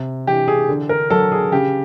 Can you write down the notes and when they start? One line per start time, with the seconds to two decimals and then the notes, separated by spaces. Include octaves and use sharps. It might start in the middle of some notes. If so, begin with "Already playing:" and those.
Already playing: C3
0.27 E3 G4
0.48 G#4
0.69 D3
0.89 A#4
1.10 F#3 A4
1.32 G#4
1.52 C#3 G4